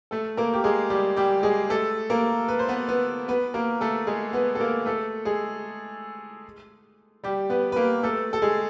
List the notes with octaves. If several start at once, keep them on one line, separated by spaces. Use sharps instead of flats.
A3 A4
A#3 A#4
G4
G#3 G#4
G3 G4
G3 G4
G#3 G#4
A3 A4
A#3 A#4
B4
C5
B3 B4
B3 B4
B3 B4
A#3 A#4
A3 A4
G#3 G#4
B3 B4
A4
A#3 A#4
A3 A4
G#3 G#4
G3 G4
B3 B4
B4
A#3 A#4
A3 A4
A4
G#3 G#4